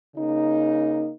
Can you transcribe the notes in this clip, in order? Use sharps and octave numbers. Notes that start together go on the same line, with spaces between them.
C#3 A#3 D#4